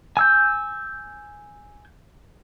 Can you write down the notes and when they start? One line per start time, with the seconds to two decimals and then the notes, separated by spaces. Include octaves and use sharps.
0.17 G#5 E6 G6